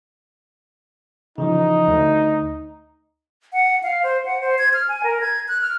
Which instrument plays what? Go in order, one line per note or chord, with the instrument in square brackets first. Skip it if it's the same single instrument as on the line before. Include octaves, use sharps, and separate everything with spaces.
[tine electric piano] C#3 E3 F3 [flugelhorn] D#4
[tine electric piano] D2
[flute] F#5
F5
C5
F#5
C5
G#6
F6
G#5
A#4
G#6
F#6
F6